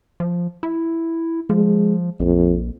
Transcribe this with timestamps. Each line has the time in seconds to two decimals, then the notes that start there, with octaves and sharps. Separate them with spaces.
0.20 F3
0.63 E4
1.50 F3 G#3
2.20 A#1 F2